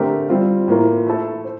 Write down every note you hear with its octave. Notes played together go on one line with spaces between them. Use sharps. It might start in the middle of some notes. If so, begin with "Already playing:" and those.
Already playing: D3 A3 C4 G4 A#4
G3 C4 F4
A2 E3 A#3 F4 A#4
A3 E4 A4
C5